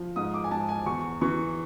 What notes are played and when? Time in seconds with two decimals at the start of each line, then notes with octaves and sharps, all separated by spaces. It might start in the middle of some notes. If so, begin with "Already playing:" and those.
Already playing: F3
0.16 G#2 D#6
0.34 D6
0.44 G#5
0.51 G#2 A5
0.69 G#5
0.86 E2 C#6
1.21 E3 C#6